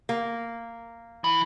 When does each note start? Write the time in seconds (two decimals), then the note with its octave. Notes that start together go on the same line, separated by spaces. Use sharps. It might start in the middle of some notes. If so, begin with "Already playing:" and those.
0.09 A#3
1.24 E3